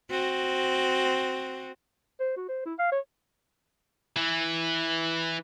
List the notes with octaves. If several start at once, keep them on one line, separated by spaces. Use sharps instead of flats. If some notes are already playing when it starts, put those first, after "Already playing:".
C4 F#4
C5
F#4
C5
E4
F5
C#5
E3